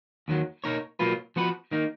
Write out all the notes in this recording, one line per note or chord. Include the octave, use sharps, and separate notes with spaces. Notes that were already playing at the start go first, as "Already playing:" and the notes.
D#2 D#3 F#3
B2 A#3 D#4 A#4 C#5
B2 F#3 A#3 F4 B4
F3 B3 F#4 B4
D#3 A#3 D#4